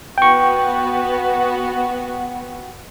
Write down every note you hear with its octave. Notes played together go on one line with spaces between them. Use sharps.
B3 F#4 G5 C#6